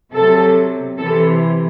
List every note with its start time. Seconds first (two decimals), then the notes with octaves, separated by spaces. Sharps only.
0.13 C3 F#3 A4
0.98 C3 E3 A4